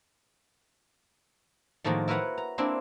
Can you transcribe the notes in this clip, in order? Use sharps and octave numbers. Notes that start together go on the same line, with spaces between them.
A2 D#3 F3 G#3 A#3 F#4
E4 A#4 B4 C#5 F#5 A#5
A#5
A#3 C4 D4 E4